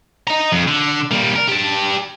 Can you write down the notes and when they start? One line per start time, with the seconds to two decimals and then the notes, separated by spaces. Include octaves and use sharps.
0.27 D#5 A#5
0.52 F2
0.67 D3
1.11 G3 A#3
1.36 A#4
1.48 G4 A5